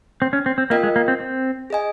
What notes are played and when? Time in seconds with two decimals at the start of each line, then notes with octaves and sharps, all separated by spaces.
0.22 C4
0.33 C#4
0.46 C4
0.58 C4
0.70 A#3 F4 A#4 D#5 G5
0.83 G#3
0.96 A#3
1.08 C4
1.20 C4
1.70 G#4 D#5 G#5